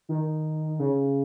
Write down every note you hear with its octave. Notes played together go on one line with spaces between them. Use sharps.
D#3
C#3